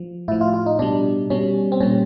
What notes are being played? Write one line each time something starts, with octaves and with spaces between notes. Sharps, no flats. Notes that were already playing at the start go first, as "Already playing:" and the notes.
Already playing: F3
A2 F3 E4
F4
F4
D#4
B2 G3 D4
B2 G3 C#4
C4
A#2 G3 C#4